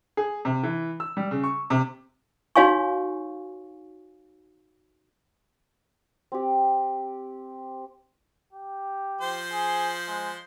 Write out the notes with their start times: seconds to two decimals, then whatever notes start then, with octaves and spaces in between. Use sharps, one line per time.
0.17 G#4
0.45 C3
0.63 E3
1.00 E6
1.17 G3
1.31 C#3
1.44 C#6
1.70 C3
2.56 D#4 F#4 C#5 F5 G#5 C#6
6.32 C4 G4
8.53 G4
9.21 F3 C5
9.53 G#4
10.08 G#3